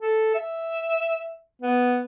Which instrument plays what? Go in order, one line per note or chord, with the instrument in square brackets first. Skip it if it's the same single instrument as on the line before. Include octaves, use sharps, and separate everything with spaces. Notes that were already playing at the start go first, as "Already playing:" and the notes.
[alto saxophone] A4
E5
B3